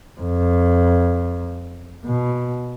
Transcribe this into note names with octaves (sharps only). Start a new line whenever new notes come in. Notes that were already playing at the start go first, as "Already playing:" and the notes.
F2
B2